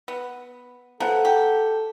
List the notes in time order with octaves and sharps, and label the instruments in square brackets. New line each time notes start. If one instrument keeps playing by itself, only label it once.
[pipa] B3
[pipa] F3 G#3 B3 [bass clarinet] A4 [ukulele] F#5 A#5
[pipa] G4